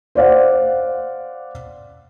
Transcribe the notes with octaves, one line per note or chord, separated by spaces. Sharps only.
C5 D5 F5 F#5